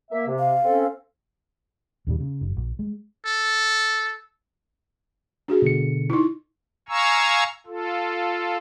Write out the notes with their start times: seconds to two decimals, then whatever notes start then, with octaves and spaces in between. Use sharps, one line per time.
0.11 A#3 E5
0.27 C3
0.39 F5
0.65 C4 C#4 A4
2.07 D#2 A#2 G3
2.20 C#3
2.41 F#1
2.56 A#1
2.79 G#3
3.26 A4
5.48 D4 F#4 G#4
5.62 B2 D3 C#7
6.10 D#4 E4
6.89 F5 G#5 A#5 C#6 E6
7.66 F4 A4